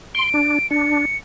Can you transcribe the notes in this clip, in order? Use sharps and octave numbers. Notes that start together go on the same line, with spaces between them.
C6 D7
D4
D4 C#7